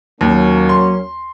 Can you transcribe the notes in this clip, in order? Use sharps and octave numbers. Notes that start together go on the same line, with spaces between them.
D#2 F#3 A#3 C#4
C6